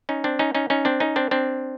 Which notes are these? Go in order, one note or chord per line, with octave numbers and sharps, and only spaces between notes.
C#4 D#4
C4 D4
C#4 D#4
C#4 D#4
C#4 D#4
C4 D4
C#4 D#4
C4 D4
C4 D4